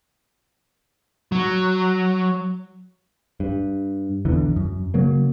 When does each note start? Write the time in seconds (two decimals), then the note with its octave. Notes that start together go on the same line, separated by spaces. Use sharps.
1.32 F#3
3.40 G2
4.25 B1 E2 D3 E3
4.56 F#2
4.94 C#3 F#3 A#3